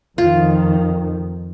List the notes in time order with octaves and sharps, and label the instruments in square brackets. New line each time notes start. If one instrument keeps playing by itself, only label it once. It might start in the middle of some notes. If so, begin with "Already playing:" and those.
[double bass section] F2 D#3 [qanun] F4